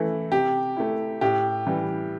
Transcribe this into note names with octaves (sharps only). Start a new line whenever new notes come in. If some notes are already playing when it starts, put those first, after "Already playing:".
Already playing: E3 A3 E4
C3 G4
A3 E4
A2 G4
E3 G3